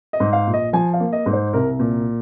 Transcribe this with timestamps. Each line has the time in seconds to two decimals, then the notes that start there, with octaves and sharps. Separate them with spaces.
0.13 D#5
0.20 G#2
0.33 F5
0.47 A#1
0.54 D#5
0.73 F3 G#5
0.94 F5
1.00 A#3
1.13 D#5
1.26 G#2
1.33 C5
1.53 C2 A#4
1.79 A#2